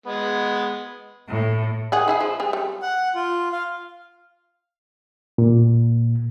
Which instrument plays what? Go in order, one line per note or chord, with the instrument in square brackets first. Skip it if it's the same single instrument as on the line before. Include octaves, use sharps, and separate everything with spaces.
[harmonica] G#3 B3
[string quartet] A2
[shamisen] D#3 G#4 F#5
D#4 E4 G#4
F3
G3 G#4
G3
[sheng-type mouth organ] F#5
F4
F5
[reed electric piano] A#2